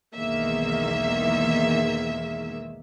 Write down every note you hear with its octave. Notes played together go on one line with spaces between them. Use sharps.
B1 E2 D#3 G#3 A#3 E5